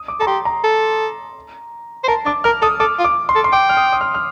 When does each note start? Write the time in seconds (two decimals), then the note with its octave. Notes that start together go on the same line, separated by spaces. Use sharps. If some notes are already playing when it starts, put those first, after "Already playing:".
Already playing: D#6
0.08 D6
0.20 A4 A#5
0.27 G4 C6
0.45 A#5
0.64 A4
2.04 C5
2.08 A#4 A5
2.25 D4 D6
2.44 A#4 F6
2.62 A4 D#6
2.80 A4 D6
2.99 F4
3.04 D6
3.29 C6
3.35 A4
3.44 C6
3.52 G5 D6
3.69 F6
3.77 D#6
3.92 D#6
4.01 F6
4.14 F6